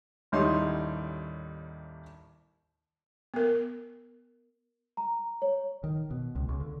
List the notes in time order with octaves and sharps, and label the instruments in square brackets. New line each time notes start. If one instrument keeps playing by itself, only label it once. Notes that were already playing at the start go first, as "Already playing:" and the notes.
[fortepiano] A1 D#2 G3 D#4 C#5 C6
[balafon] B3 A#4
[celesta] A#5
C#5
[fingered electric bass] D#3
B2
C#2
C#2
D3